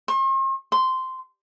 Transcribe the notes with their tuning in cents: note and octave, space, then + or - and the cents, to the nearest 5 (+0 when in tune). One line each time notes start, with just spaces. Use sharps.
C6 +45
C6 -10